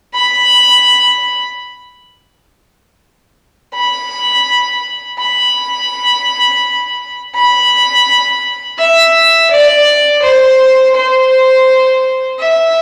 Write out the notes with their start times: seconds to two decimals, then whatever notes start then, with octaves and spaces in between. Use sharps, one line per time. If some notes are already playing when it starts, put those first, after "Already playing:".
0.14 B5
3.74 B5
5.19 B5
7.35 B5
8.79 E5
9.51 D5
10.23 C5
10.95 C5
12.39 E5